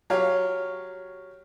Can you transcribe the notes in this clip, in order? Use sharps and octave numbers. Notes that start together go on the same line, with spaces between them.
F#3 G4 C#5 F5